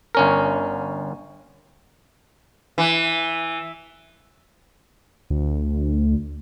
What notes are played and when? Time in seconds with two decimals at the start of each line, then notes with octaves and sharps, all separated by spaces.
0.15 G1 C#4 A#4
2.78 E3
5.30 D2